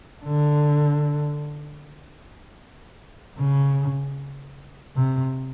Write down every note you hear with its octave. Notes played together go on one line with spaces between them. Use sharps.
D3
C#3
C3